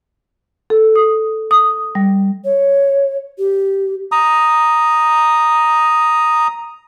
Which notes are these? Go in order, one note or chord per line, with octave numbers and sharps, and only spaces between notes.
A4
D#6
D#6
G3
C#5
G4
A#5 D#6